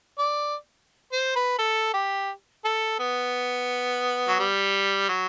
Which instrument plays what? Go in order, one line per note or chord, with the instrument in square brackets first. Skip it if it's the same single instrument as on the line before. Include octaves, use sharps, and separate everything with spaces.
[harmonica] D5
C5
B4
A4
G4
A4
B3
F#3
G3
F#3